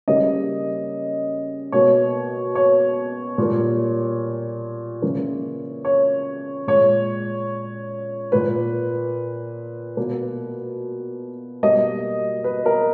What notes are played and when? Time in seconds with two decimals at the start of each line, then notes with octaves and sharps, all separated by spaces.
0.08 C#3 G3 A#3 D#5
1.72 B2 A#3 C#5
2.55 C#5
3.38 A#2 G3 A#3
5.02 C#3 E3 A#3
5.85 C#5
6.67 A#2 G#3 C#5
8.32 A#2 A#3 B4
9.97 B2 A#3
11.63 B2 G3 A#3 D#5
12.44 B4
12.66 A#4